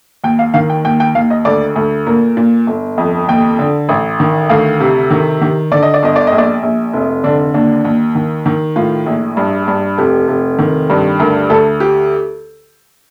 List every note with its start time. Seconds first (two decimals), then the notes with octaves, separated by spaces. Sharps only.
0.24 D#2 G5
0.39 F5
0.54 D#3 F5
0.70 G5
0.85 D#2 G5
1.00 G5
1.15 D#2 F5
1.30 D#5
1.45 D2 D5
1.76 D2
2.07 A#2 A#4
2.37 A#2
2.67 G1
2.98 F2
3.29 D#2 G5
3.59 D3
3.89 A1
4.20 D#3
4.49 D2 F5
4.80 C3
5.11 D#3
5.42 D#3
5.72 D3 D5
5.83 D#5
5.94 D5
6.03 G1 D#5
6.16 D5
6.27 D#5
6.32 A#1
6.38 D5
6.63 A#1
6.93 F1
7.24 D3 D4
7.54 D#2 D4
7.85 D#2
8.15 D#3
8.46 D#3
8.76 A2 F4
9.06 A#1
9.37 G2
9.68 G2
9.98 F1 G4
10.28 F1
10.59 D#3
10.90 G2
11.20 D2 A#4
11.50 D2 A4
11.80 G4